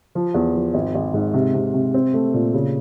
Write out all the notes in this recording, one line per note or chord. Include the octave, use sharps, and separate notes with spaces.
F3
E2
F3
G#1
G#1
G#2
C3
C3
C3
C4
A3
A#2
C#3